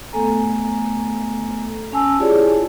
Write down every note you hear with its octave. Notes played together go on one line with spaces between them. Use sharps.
A3 B3 A4 G#5 A#5
C#4 G#5 A5 E6
E4 F4 G4 G#4 C#5 D5